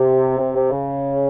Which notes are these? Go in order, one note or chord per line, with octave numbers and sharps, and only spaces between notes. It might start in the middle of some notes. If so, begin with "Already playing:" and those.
Already playing: C3
C3
C3
C#3